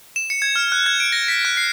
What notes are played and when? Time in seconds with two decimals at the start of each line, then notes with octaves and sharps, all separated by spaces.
0.16 E7
0.30 C#7
0.42 G#6
0.56 F6
0.72 F#6
0.86 G#6
1.00 D7
1.12 A#6
1.28 B6
1.45 F#6
1.57 C7